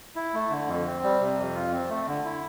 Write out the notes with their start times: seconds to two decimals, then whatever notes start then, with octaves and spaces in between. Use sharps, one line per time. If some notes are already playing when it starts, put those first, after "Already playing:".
0.16 E4
0.34 A3
0.50 D3
0.68 F2
0.86 C4
1.03 G3
1.21 C3
1.38 F2
1.55 F4
1.72 C4
1.89 A3
2.07 D3
2.25 E4